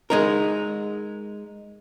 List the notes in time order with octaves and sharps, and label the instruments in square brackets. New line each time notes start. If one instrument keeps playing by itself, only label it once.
[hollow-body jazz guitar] G#3 D#4 A#4